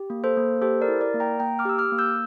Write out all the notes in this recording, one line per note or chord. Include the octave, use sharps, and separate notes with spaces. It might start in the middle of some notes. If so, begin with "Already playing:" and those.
Already playing: G4
A#3
A4 C5
A#3
G4 A4 C5
A#4 D5
E4
A#4 D5
A#3
G5 A#5
A#3 G5 A#5
D6 F6
G4 E6
D6 F6
A#3
E6 G6